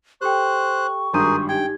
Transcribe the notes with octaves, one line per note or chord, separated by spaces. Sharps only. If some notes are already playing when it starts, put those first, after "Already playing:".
G4 A4 C5 G5 C#6 F#6
G#1 G2 G#4 A#4 C6 G6 D#7
D4 D#4 G4 G5 G#6